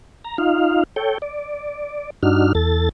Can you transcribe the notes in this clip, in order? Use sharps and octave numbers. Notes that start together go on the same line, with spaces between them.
A#5
D#4 F4 F5
A4 C#5 G5
D5
G2 D4 D#4 F#4 F6
E2 A4 A6